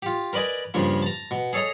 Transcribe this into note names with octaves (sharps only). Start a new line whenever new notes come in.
F4 G4
A#4 B4 D5 D#5 G#5
G2 C#3 F3 A#3
A5 A#5
B2
G#4 A4 C#5 D#5 A#5